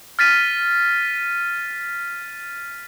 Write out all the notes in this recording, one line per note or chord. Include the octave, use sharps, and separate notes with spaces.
F6 A6 B6 D#7